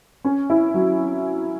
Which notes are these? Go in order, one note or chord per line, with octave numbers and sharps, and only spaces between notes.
C#4
E4
F#3